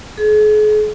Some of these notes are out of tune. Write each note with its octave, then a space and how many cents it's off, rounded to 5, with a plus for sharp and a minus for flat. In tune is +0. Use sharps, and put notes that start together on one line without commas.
G#4 +40